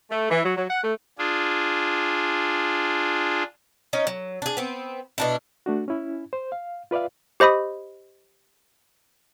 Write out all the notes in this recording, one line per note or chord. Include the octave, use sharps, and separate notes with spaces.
A3
E3
F#3
F#3
F#5
A3
D4 F4 G#4
C#4 D#4 D#5
F#3
D4 G#4
B3 C4
B2 D4 E4
A3 D4 F#4
C#4 E4
C5
F5
F4 B4 D5 E5 F5
G4 C5 D#5 B5 D#6